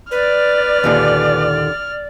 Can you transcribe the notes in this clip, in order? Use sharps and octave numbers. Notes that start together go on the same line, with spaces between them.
B4 D5 F6
D#2 A#2 D3